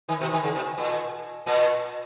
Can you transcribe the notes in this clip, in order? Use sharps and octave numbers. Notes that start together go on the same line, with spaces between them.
D#3
B2
D#3
C#3
B2
A#2
A#2